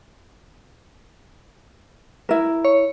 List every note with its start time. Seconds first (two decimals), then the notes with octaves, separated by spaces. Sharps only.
2.29 E4 A#4
2.65 C#5